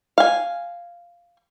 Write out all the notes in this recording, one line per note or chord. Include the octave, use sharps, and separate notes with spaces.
F5 G#5